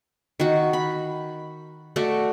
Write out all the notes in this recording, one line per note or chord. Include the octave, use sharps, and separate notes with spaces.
D#3 F#4
B5
A3 F#4 D5